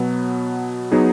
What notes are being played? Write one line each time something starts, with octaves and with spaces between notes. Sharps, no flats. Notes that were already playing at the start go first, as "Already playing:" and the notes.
Already playing: B2 F#3 B3
F#3 B3 D#4 G#4